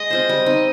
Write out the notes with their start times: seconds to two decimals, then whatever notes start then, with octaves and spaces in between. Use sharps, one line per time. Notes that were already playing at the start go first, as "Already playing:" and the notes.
Already playing: G#3 D#5
0.10 C4 F4 C5
0.29 G3
0.46 C4 D#4